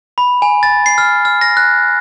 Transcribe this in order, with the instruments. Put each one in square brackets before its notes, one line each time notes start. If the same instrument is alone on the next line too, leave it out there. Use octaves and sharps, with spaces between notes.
[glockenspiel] B5
G#5
A6
C7
F6
F6
A#6
F#6